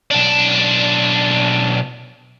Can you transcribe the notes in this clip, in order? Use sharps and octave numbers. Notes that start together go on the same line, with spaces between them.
B1 D4